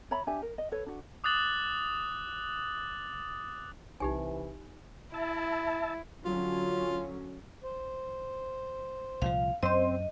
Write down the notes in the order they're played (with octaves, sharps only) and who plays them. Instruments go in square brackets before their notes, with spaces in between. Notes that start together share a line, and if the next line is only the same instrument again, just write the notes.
[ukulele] C#5 E5 A#5 B5
D4 G4 E5 G#5
A#4
D#5
A4 B4 C#5
D4 F#4
[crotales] D6 D#6 F#6 A6 F#7
[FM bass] B1 [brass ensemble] C3 E3 [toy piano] D#4 G4 G#5
[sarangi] E4 [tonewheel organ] E5 A5
[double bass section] D3 F#3 C#4 [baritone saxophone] F4
[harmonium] C5
[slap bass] C2 A#2 F3 [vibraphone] F5
[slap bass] F#2 [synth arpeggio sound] C4 C5 [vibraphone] D#5